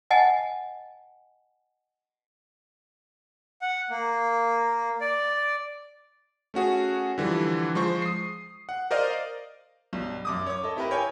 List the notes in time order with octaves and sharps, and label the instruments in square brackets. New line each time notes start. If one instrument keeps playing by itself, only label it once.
[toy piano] D#5 F#5 G#5 A5
[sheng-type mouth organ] F#5
A#3
D5
[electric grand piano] A3 C#4 F#4 G#4
D3 E3 F3 G3
F3 G#3 C5 C#6
D#6 C7
F#5
A#4 C5 D5 D#5 F5
[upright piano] B1 G2
F#2 D6 D#6
C#5 D6
A4 D#5
C4 E4 G4 A#4 B4
A#4 C#5 G5 G#5